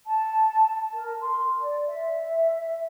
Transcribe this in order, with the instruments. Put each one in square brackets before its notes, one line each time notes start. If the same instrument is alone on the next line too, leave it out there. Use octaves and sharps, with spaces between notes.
[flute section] A5
A#4
C6
D5
E5